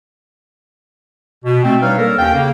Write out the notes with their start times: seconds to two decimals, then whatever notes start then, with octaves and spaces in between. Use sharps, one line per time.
1.45 B2
1.63 A3 C4
1.82 G3 D4 D#4 B4 C#5 F5
1.98 A#3 A4 A#4
2.19 D#2 C#4 F5 G5
2.34 C#3 A#3